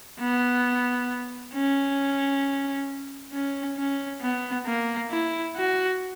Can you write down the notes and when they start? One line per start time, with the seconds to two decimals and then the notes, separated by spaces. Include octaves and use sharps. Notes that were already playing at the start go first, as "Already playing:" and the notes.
0.19 B3
1.53 C#4
3.32 C#4
3.77 C#4
4.21 B3
4.66 A#3
5.11 E4
5.56 F#4